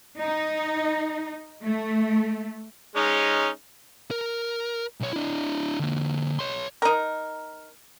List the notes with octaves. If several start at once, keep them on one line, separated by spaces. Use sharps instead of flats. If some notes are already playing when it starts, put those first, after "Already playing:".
D#4
A3
G#3 C#4 D#4
A#4
B1 C#5
D4 E4
D3 A#3
C#5 C6
D#4 A#4